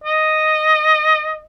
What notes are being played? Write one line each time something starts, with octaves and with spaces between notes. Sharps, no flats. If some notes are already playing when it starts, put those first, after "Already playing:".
D#5